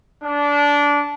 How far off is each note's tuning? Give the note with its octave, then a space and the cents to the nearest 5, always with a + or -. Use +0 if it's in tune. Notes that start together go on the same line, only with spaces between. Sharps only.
D4 -20